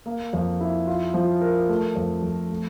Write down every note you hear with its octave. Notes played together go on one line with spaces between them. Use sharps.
A#3
F2
E4
F4
F3
A#4
A3
F2
F2
A3